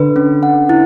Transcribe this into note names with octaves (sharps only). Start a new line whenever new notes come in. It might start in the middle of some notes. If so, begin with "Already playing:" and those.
Already playing: D3 B4
C#4
F#5
E4